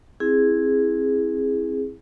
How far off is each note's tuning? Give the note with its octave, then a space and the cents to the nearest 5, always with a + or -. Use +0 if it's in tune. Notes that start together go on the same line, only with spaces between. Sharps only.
C4 +20 E4 +0 G#4 -5